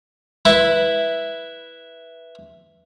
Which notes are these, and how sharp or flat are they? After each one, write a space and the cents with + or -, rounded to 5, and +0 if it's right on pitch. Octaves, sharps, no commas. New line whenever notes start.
E4 +0 B4 -5